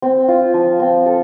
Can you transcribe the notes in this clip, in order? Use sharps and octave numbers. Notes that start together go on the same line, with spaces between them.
C4
F4
F3
C4
A4